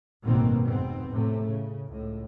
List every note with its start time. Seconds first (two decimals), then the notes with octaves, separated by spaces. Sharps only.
0.24 A1 G2 B2 D#3 A#3 C4
0.65 F1 G#2 B3 C4
1.09 A2 C3 A3
1.46 C#3
1.89 C#2 A2